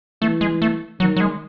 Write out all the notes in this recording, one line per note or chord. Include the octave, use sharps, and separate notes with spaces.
E3 A3
G#3
A3
D#3 F#3
F#3
G#3